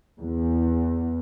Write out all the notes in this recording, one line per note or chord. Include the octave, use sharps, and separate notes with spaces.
E2